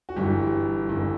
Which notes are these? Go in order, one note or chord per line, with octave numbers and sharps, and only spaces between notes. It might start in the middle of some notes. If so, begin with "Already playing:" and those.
F#4
G1 G2 E3 G4
G1 G2 E3